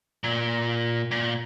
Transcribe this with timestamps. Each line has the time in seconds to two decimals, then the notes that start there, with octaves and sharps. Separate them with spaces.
0.24 A#2
1.11 A#2